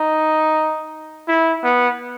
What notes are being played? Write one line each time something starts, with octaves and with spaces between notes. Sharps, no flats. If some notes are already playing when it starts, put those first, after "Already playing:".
Already playing: D#4
E4
B3